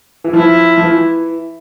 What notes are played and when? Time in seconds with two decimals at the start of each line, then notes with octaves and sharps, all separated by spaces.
0.24 E3
0.33 F3 E4
0.78 F3
0.83 E3